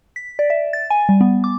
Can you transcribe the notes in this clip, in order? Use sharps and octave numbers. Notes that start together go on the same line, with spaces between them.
B6
D5
E5
A6
G#5
G3
B3
D6